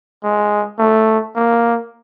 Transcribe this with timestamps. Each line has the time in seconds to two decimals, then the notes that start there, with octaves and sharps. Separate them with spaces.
0.24 G#3
0.79 A3
1.35 A#3